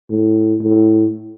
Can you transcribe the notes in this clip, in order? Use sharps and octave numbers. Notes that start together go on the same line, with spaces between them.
A2
A2